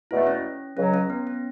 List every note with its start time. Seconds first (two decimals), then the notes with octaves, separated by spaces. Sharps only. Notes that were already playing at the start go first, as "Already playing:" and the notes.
0.11 E2 B2 A3 E4
0.27 C#4
0.77 C#2 C#3 F#3 C#4
0.94 C#4
1.10 B3
1.27 C#4